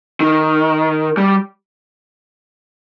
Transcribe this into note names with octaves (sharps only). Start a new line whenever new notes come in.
D#3
G3